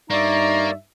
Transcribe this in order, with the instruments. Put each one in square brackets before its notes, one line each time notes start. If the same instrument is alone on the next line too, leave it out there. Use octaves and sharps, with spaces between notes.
[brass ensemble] G2 D#4 E5 [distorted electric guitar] A#3 [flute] D5 [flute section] A#5 C#6